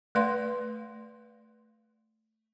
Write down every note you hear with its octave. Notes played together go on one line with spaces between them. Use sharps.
A3 B4 D5 F5 C6